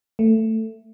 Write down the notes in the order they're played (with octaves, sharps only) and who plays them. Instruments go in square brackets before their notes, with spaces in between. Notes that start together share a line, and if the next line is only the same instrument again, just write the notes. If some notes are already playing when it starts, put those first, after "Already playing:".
[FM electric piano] A3